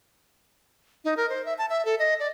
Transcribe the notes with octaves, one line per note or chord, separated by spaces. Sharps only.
D#4
A#4
C5
E5
A5
E5
A4
D#5
D5